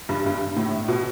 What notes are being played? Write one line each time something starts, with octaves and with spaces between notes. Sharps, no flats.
G2
G2
A2
B2